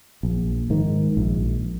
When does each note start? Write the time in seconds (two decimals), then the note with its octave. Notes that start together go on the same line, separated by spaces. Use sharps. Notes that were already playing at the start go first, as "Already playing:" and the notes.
0.23 A#1
0.70 G#2 D#3
1.17 A#1